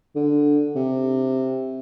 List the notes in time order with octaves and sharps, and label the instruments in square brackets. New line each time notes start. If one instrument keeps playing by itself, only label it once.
[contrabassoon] D3
C3